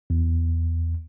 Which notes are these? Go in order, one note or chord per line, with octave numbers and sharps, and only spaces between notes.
E2